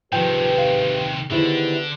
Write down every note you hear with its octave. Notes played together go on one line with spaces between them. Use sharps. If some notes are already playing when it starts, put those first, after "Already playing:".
C3 D#3 F3 G4 G#4 B4 G5
F5
D3 D#3 B3 E4 G4 G#4 C5